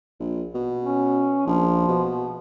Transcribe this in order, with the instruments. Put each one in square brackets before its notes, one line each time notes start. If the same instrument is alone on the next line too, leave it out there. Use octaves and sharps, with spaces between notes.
[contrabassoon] A#1
B2
[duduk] C#4
[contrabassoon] A#1 [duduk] F3
[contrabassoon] B2